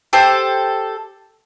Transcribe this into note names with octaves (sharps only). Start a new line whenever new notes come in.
G4 A4 C5